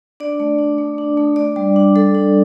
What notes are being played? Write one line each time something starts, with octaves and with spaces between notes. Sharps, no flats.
D4 D5
A3
D4
A3
D4
A3
D4 D5
G3
D4
G3 A4
D4